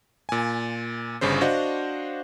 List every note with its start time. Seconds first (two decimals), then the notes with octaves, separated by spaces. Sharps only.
0.29 A#2 G#5
1.21 G1 G2 C#3 C5
1.41 D4 F#4 C5 D#5 F5 F#5